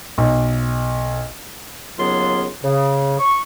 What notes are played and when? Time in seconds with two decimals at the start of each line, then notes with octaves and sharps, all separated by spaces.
0.18 B1
1.99 D#2 C#3 F#3 B3 F4 C6
2.63 C#3
3.19 C#6